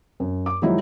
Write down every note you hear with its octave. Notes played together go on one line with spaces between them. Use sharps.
F#2
D6
D#3 F3 F#3 G#3 D#4 E4